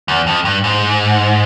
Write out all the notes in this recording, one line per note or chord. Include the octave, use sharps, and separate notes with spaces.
E2
F2
G2
G#2